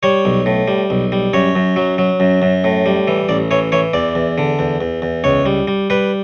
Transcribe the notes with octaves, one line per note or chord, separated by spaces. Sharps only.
G3 C#5
B1
A2
G3
B1
G3
F#2 C#5
F#2
F#3
F#3
F#2
F#2
A2
G3
E3
A1 D5
E3 C#5
E3 C#5
E2 D5
E2
D3
E2
E2
E2
C#2 C#5
G3
G3
G3 B4